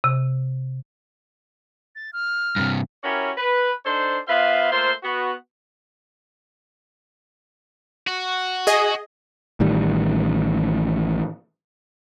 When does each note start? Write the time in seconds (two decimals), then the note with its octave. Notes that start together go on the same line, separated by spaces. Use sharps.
0.04 C3
1.96 A6
2.13 F6
2.56 G2 C3
3.03 C#4 E4 F#4 G4 A#4 C#5
3.37 B4
3.85 D4 D#4 A4 C5
4.27 B3 F4 B4 C5 E5 F5
4.72 A3 A#3 F4 C5
5.03 B3 F#4
8.07 F#4
8.67 G#4 D#5
9.60 A1 A2 D#3 G3